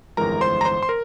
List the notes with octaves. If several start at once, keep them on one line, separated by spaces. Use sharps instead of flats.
G1 F2 E3 G#3 A#4 A#5
C5 C6
A#5
C5 C6
C6
A#4